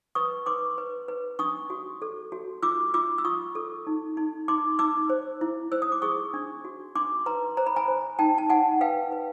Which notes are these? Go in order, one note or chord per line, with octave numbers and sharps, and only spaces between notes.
B4 C#6 D#6
B4 C6 D6
B4
B4
D4 C#6 D#6
F#4
A4
F#4
F4 D6 E6
F4 D6 E6
E6
F4 C#6 D#6
A4
D#4
D#4
D#4 C6 D6
D#4 D6 E6
C5
E4
C5 E6
D#6
D6
G#4 C#6 D#6
D4
F#4
D4 C6 D6
B4 A#5 C6
C5 A#5
B5
G#5 A#5
C5
D#4 G5 A5
A5
D#4 F#5 G#5
B4 F5 G5
B4